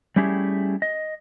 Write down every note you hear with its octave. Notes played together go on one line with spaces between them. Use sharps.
G3 A3 C#4 E4 G4 G#4
D#5